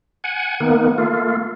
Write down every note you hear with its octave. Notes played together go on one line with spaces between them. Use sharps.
F#5 G#5
D#3 A#3 B3
A3 A#3 F4